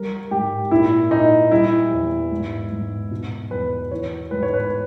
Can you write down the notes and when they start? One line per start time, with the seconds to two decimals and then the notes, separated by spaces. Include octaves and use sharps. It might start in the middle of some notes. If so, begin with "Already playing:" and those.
Already playing: G3 A#4
0.31 G#2 G4
0.71 A#2 E4
1.11 A#2 D#4
1.51 G3 E4
1.91 E2
2.31 G#2
2.72 G#2
3.11 B2
3.51 E2 B4
3.91 E3 C#5
4.31 G#2 B4
4.43 C#5
4.54 B4